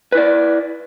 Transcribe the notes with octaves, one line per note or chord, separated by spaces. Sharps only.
E4 B4 D5